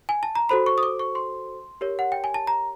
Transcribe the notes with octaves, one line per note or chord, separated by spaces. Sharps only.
G#5
A5
A#5
F#4 A4 C5 B5
C#6
D#6
D6
C#6
C6
G4 A#4 C#5
F#5
G5
G#5
A5
A#5